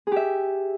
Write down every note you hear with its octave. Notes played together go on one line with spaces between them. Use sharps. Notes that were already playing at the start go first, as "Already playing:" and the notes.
G4 G#4 E5